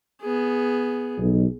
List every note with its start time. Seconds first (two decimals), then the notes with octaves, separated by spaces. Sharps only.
0.22 B3 G#4
1.19 B1